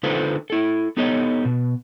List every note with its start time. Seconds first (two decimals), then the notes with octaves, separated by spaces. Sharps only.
0.03 D3 D#4 F4 A4 B4 C5
0.50 E4 A4
0.97 B3 D#4 G4 A4 C#5 D#5
1.45 B2